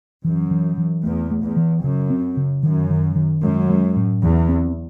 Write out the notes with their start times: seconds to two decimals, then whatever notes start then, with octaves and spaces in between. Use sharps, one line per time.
0.24 F#2 E3
0.51 E3
0.78 E3
1.04 E2 A3
1.31 A3
1.43 E2
1.57 E3
1.83 F#2 C#3
2.10 C4
2.37 C#3
2.63 F#2 D#3
2.90 D#3
3.16 D#3
3.43 F#2 G#3
3.70 G#3
3.96 A2
4.22 E2 E3
4.49 C4